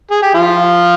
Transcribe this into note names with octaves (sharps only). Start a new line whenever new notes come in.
G#4
G4
F3 F4